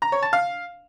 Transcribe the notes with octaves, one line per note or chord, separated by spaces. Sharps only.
A#5
C#5
A5
F5